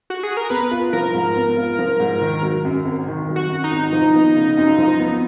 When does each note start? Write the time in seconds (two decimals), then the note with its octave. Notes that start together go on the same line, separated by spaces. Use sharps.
0.10 F#4
0.23 G#4
0.37 A#4
0.50 B3 B4
0.71 F4
0.93 F3 A#4
1.14 G#2
1.36 B3
1.57 F4
1.79 F3
2.00 G#2
2.22 D#3
2.43 F#3
2.65 F#2
2.85 G#1
3.08 D#3
3.29 F#3
3.36 F#4
3.50 F#2
3.64 D#4
3.71 G#1
3.92 F3
4.14 B3
4.35 C#3
4.57 F#2
4.78 F3
5.00 B3